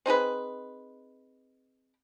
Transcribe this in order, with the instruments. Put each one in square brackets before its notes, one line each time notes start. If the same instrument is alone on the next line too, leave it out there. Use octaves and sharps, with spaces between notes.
[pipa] C4 D#4 G#4 B4